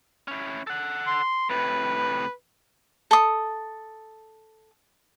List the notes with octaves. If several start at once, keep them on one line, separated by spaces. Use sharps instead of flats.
C#4 E4
A4 F#5
C6
A2 C3 B4
A4 D#6